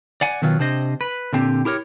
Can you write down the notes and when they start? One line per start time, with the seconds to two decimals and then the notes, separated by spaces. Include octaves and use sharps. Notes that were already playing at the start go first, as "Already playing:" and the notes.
0.21 D5 F#5 G#5
0.42 B2 D#3 F#3 F4
0.59 C3 D4 C5 D#5
1.01 B4
1.33 A#2 D3 C4 G4
1.65 E4 G4 A#4 C#5